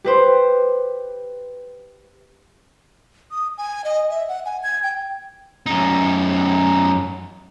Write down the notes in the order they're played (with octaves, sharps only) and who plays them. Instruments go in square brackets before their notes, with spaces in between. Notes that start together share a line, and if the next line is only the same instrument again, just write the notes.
[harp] G4 B4 C5
[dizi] D#6
G#5
D#5
E5
F#5
G#5
G#6
G5
[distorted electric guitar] F#2 D#4